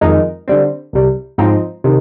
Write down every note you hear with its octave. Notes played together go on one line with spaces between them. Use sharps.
F2 D#3 G#3 D#4 A#4
D3 G3 C4
C2 C3 G3
G#2 F3 C4 D#4
C3 D#3